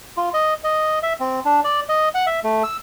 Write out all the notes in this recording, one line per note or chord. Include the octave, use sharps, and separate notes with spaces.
F4
D#5
D#5
E5
C4
D4
D5
D#5
F#5
E5
A3
E6